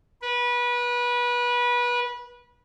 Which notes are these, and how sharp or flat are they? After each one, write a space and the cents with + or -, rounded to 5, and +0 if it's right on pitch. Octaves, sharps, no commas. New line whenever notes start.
B4 -25